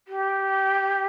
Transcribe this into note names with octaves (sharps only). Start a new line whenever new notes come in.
G4